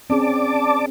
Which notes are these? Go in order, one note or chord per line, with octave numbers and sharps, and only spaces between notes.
C4 C#4 G#4 D5 A5 D6